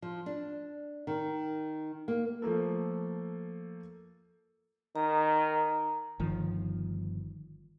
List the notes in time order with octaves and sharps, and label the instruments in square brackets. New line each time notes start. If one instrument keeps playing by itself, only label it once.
[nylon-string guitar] F3
D4
D#3
A#3
[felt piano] F3 A3 A#3 A4
[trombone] D#3 [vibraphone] A#5
[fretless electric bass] G1 D#3 F3